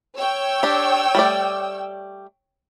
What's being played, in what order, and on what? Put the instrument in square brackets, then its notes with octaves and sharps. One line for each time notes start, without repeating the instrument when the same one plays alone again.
[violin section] C#5 G5 E6
[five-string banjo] D4 G4
G3 A3 D5